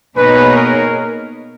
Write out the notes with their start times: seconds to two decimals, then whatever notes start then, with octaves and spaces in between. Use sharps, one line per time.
0.17 B2 A#3 D#4 G#4 B4 C#5
0.56 A#4